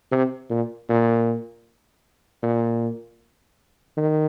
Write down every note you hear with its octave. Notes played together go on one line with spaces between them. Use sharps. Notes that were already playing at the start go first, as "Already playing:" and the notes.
C3
A#2
A#2
A#2
D#3